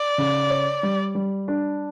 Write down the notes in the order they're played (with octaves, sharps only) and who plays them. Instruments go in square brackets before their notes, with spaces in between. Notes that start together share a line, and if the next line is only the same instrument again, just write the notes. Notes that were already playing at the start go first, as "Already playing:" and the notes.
Already playing: [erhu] D5
[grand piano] C#3
C#5
G3
G3
D4